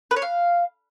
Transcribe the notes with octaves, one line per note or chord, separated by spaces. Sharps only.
B4
C#5
F5